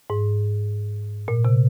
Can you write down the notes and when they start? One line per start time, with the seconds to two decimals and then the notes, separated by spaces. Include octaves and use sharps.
0.10 G#2
1.28 A#2
1.45 C3